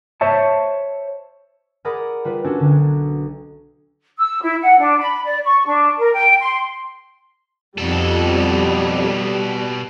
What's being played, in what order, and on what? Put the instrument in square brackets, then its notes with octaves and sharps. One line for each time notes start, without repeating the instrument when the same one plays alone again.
[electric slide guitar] C5 C#5 E5 A5
[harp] G#4 A#4 D5 F#5 B5 D#6
G3 F4 B4
C#4 D4 F#4 A4 C5
B1 D3
[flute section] E6
E4
F#5
D4
B5
D5
C#6
D4
A#4
G5
C6
[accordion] F2 [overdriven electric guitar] B2 A4 [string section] G3